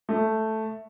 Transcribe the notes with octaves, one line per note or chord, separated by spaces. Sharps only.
A3